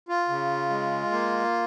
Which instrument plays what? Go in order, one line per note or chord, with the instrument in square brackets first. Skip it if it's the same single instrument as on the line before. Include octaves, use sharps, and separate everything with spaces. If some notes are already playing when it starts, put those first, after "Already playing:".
[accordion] F4
C#3
G#3
A#3